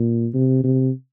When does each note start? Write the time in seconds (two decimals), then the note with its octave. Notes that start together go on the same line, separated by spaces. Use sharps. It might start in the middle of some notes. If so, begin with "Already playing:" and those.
Already playing: A#2
0.34 C3
0.64 C3